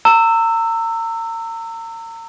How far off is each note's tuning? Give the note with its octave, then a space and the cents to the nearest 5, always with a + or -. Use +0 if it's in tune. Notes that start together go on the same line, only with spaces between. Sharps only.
A#5 -35 E6 +5